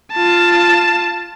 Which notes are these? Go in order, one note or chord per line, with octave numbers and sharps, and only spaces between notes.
F4 A5